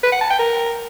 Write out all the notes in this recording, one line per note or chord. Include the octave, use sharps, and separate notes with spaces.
B4
F#5
A5
G5
A#4